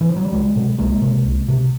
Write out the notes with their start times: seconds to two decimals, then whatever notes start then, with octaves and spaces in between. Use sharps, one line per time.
0.01 E3
0.09 F3
0.16 F#3
0.25 G3
0.32 C#2 F#3 G#3
0.56 B2
0.78 C2 G#3 A#3
1.02 C3
1.25 C2
1.48 C3